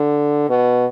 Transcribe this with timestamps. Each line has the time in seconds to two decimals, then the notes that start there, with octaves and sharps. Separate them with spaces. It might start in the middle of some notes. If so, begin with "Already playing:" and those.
Already playing: D3
0.49 B2